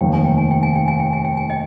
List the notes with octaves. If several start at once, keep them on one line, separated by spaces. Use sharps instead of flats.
F1 D#2 D#3 G5
G#5
G5
G#5
G5
G#5
G5
G#5
G5
G#5
G5
G#5
D#5 G5